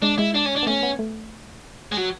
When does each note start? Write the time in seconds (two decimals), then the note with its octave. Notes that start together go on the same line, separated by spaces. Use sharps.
0.02 G#3 D4
0.18 G#3 E4
0.35 D4
0.45 C#4
0.56 D4
0.63 B3
0.67 A3 C#4
0.83 B3
0.99 A3
1.92 G#3
1.97 F#3